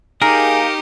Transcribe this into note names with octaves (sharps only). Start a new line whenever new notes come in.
A#3 D#4 G4 G#4 A#4